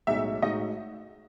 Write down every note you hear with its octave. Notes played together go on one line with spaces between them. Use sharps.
B1 A2 G#3 D#4 F#4 E5
A2 G#3 D#4 F#4 D#5